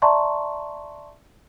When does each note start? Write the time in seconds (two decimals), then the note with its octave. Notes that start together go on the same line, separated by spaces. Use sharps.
0.02 D5 E5 A5 A#5 C6 C#6